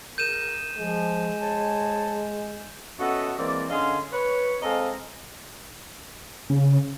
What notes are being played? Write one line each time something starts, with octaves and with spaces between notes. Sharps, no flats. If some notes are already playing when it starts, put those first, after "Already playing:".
G#4 A#4 G6 D#7 E7
F3 G#3
C5 C#5 A5
B3 C#4 F#4 A4 D#5 E5
E3 G#3 A#3 C4 D5
D3 C#4 G#4 D#5 F5 C6
B4 C#5
G#3 C4 A4 D#5 F5 A#5
C#3